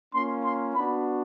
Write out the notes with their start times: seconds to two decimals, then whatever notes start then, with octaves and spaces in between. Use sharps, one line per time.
0.13 A#3 C#4 F4 C6
0.45 C6
0.75 B3 D4 F#4 B5